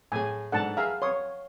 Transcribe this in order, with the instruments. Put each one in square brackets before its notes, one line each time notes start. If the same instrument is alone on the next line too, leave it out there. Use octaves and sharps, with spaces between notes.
[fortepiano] A2 G#4 [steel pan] G#5
[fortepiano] G#2 D4 A4 [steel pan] F#5 A5
[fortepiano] G#4 E5 A#5 [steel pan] F5
[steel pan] C#5 [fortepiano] C6 D#6